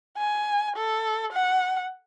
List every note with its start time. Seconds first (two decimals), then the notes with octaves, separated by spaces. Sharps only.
0.18 G#5
0.76 A4
1.33 F#5